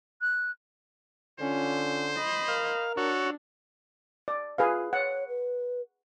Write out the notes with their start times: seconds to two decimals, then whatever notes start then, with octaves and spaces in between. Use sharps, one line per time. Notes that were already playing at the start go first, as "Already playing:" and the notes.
0.21 F#6
1.40 D3 C#4 F4 C5
2.17 D#5 B5
2.48 A#4 F5
2.97 D4 F#4 A4 C#5
4.28 D5
4.58 F4 G#4 B4 F5
4.93 C#5 F#5
5.28 B4